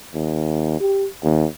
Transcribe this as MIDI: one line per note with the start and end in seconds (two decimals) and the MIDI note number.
0.15 0.76 39
0.80 1.07 67
1.24 1.45 39